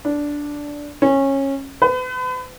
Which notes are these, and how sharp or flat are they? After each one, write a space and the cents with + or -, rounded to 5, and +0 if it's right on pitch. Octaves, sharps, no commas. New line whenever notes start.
D4 -10
C#4 -20
B4 +40